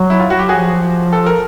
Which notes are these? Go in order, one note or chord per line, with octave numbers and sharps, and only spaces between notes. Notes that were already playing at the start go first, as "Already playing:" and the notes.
Already playing: F#3
E4
F4
F#4
G4
F3 F#4 G#4
A4
A#4